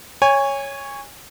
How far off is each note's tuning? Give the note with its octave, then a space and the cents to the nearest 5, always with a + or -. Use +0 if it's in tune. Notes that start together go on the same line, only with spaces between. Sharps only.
C#5 +0 G#5 -25